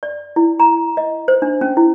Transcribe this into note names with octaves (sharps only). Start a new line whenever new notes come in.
D5
E4
A#5
D#5
C5
D4
C#4
E4